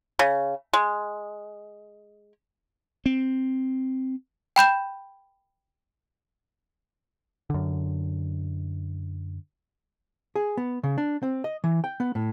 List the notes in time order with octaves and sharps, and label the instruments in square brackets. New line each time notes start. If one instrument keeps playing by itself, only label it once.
[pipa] C#3
G#3
[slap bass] C4
[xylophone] G5 B5 G6 E7
[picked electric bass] F#2 D3
[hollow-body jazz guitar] G#4
B3
C#3
D4
C4
D#5
E3
G5
B3
A2